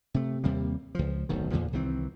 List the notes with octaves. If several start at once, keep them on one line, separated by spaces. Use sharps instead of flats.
C3 A3
D#2 C3 G3 A#3
C#2 F3
D1 B1 D#3
E2 A#2 D3 F3
C2 D#3 E3 C4